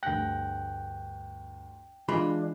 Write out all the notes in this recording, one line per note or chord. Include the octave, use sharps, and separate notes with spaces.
D2 G2 G5 F#6 A#6
E3 G#3 D4 F4 B5